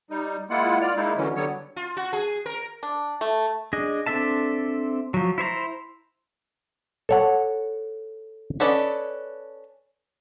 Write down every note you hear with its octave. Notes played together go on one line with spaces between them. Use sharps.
G3 D#4
G#3 A#3 E4 F4 F#5
F4 D5 F6
G#3 A#3 D#4 E4
D3 E3 F#3 C#4
D3 F#3 G3 B3 C#5
F4
F#4
G#4
A#4
D4
A3
D4 G#4 D#5
C4 D4 A4 E5 A5
F3 F#3
E4 C5 C#5 A#5
A4 C#5 F#5
C#4 A4 B4 D5 D#5